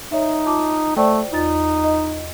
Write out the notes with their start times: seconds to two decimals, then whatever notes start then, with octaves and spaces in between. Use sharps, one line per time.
0.12 D#4 C#5 E5
0.46 F4 A5 D6
0.96 A3 C5 D5 G5
1.33 E2 D#4 F4 A6
1.84 D#5